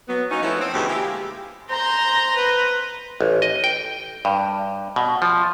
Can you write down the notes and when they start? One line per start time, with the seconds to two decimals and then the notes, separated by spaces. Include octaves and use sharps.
0.08 F#3 B3
0.31 F#3 A#3 C#4 D#4
0.43 F3 A3 B3 C#4 E4
0.59 C4
0.74 D2 B2 E3 E4 G4 G#4
0.89 G#3 A#3 E4 F4 G4
1.70 C5 A#5 C6
2.36 B4
3.21 A1
3.42 D#5
3.64 G5
4.25 G2
4.96 B2
5.22 F3